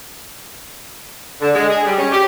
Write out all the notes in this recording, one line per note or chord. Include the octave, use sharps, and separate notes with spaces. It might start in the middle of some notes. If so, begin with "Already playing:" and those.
D3
G#3
G#4
G3
C#4
G4